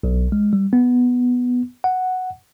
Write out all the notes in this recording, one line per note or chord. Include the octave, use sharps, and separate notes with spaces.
B1
G#3
G3
B3
F#5